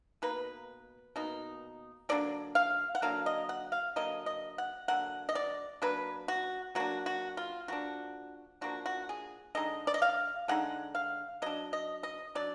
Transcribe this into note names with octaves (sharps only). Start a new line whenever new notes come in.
B2 A#3 D#4 B4
B2 A#3 D#4
D3 F#3 A#3 D4 D5
F5
F#5
D3 F#3 A#3 D4 F5
D#5
F#5
F5
D3 F#3 A#3 D#5
D#5
F#5
D3 F#3 A#3 F#5
D#5
D5
F#3 A#3 D4 B4
F#4
F#3 A#3 D4 F#4
F#4
F4
F3 A#3 D4 F#4
F3 A#3 D4 F#4
F#4
G#4
D3 G#3 D#4 D#5
D5
D#5
F5
D3 G#3 D#4 F#5
F5
F#3 D4 D#5
D#5
D#5
F#3 D4 D5